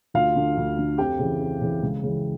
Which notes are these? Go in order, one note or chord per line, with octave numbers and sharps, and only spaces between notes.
D2 F4 F5
D3
D2
D3
F2 G4 G5
C#3 E3
F2
C#3 E3
C#2
C#3 E3